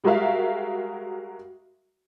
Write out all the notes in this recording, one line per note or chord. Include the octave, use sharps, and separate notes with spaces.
G3 G#3 F#4 A#4 E5 F5